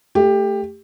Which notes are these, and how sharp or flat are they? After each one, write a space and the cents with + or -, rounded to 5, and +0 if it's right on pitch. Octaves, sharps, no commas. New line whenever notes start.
A3 +0 G4 +15